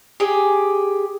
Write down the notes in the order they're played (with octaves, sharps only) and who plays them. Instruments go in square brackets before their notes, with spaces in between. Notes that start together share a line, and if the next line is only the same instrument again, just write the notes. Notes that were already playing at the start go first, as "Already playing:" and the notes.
[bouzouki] G4 G#4